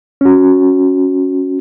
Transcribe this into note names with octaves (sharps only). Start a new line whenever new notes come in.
C#4 F#4